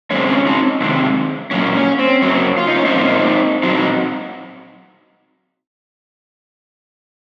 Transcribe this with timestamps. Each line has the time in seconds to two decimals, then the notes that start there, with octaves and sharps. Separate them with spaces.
0.10 F#2 C#3 G#3 C4 C#4
0.28 C#4
0.46 C4 D#4
0.80 C3 D#3 G#3 C4
1.51 A#2 F#3 A#3 C#4
1.75 C#4
1.99 C4
2.22 F#2 C#3 F#3 A#3 C#4
2.58 F4
2.67 D#4
2.76 C#4
2.85 C4 D#4
2.93 A#2 F3 A#3
3.63 A#2 F#3 C4 D#4 F#4